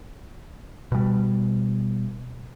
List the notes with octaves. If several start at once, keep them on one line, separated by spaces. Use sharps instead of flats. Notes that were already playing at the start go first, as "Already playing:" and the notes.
B2 G3